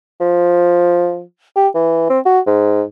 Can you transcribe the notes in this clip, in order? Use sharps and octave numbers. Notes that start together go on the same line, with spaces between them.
F3
G4
E3
C4
F#4
G#2